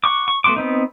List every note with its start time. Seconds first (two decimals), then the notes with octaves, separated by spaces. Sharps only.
0.04 F#5 C#6 D6
0.28 C#6
0.44 A3 B3 F#4 C6 D6
0.56 B3 C4 D#4